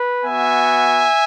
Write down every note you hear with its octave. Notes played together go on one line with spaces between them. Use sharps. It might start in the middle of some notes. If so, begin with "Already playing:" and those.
Already playing: B4
B3 F#4 E5 G#5